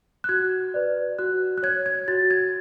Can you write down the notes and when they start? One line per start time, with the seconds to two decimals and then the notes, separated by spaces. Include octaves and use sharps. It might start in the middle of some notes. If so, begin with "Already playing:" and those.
0.24 F#6
0.29 F#4 G#6
0.74 B4 D5
1.19 F#4 F#6
1.58 F#6
1.63 C#5 G#6
1.86 G#6
2.08 F#4 A6
2.31 G#6